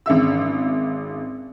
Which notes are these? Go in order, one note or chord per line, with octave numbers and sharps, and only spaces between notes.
G#1 C#3 E5 E6